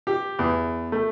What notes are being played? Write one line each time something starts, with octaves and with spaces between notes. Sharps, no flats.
G4
E2
A3